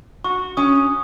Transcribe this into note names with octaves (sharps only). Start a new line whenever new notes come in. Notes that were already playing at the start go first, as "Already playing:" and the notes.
F#4 C#6
C#4 D#6